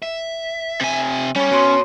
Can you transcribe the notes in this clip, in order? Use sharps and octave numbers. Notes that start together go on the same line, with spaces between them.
E5
C3 G#5
G3 C#4 C#5 C#6
B3 F#4 C#5 C6